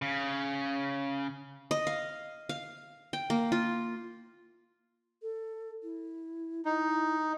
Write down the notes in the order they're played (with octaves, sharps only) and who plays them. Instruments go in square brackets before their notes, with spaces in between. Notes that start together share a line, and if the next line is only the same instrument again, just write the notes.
[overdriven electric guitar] C#3
[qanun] D#5
F5
F5
G5
A#3
F4
[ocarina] A4
E4
[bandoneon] D#4 [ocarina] E4